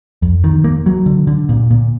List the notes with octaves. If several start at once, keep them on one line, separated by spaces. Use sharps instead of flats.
F2
D#3
A#3
F#3
D3
D3
A#2
A#2